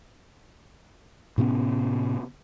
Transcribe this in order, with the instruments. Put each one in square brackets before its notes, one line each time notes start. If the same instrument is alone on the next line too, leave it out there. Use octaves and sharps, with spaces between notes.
[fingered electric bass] A2 C3 B3 C#4